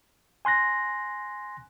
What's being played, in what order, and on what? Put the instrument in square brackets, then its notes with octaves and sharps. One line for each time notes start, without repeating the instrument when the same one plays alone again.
[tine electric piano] G#5 C6 F#6 A#6